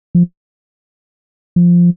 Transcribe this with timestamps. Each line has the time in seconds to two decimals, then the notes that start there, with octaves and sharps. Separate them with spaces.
0.15 F3
1.56 F3